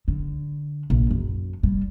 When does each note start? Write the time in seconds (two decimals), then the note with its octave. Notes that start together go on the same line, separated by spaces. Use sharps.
0.08 D3
0.90 A#1
1.11 F#2
1.63 G3